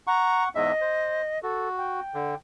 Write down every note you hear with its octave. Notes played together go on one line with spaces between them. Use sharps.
F#5 A#5 C#6
E2 G#2 D#5 E5
C5
F#4 A4
G5
D3